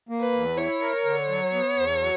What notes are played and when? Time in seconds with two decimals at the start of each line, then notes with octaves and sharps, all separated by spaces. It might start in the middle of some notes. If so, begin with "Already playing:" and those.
0.09 A#3
0.21 B4
0.33 E2
0.57 E4 C#5
0.81 A#4
1.05 D3
1.28 F#3
1.53 B3
1.77 E2
2.01 F#3